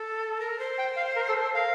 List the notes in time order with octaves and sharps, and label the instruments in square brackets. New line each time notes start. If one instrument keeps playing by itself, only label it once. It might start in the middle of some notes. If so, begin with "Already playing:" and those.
Already playing: [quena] A4
A#4
C5
[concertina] G5
F5
A#4
A4
A4
[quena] A#4 [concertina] F5